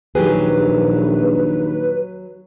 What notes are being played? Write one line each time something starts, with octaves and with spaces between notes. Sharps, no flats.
A#1 D#2 F#3 G4 G#4 B4